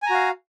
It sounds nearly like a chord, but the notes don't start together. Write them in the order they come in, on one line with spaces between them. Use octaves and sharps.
G#5 A#5 F#4 F5